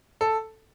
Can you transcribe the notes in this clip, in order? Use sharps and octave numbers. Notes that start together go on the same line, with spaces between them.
A4